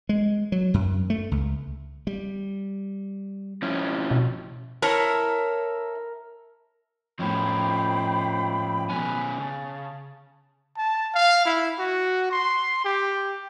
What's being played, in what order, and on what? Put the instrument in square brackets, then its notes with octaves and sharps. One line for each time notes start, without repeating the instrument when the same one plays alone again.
[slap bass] G#3
F#3
F#2
A3
C#2
G3
[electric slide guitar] F3 C#4 E4
[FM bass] B2
[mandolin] E4 A4 C#5 [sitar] A#4
[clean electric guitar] F2 A2 [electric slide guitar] F3 C#4 [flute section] C5 G5 B5
[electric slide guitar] B2 B3 C#4 [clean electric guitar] G#5 [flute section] B5 F#6
[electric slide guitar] C#3 [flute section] A5
[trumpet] A5
F5
E4
F#4
C6
G4